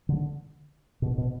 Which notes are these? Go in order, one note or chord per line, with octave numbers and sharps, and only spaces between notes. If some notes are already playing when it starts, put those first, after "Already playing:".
D3
B2
B2